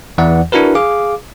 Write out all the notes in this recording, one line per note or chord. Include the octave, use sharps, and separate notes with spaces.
E2 E3 D5 F#5
D4 E4 F#4 A#4 B4
G#4 F5 D6